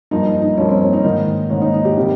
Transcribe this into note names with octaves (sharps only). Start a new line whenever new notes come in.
G2 F3 A#3 D#4
D#4
D#4
G2 F3 A#3 C#4
C4
C#4
D#4
G#2 D#3 A#3
G#2 D#3 A#3 C#4
D#4
D#4
G4
C3 D#3 G3